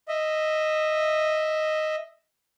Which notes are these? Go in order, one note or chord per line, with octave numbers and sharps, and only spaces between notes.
D#5 E5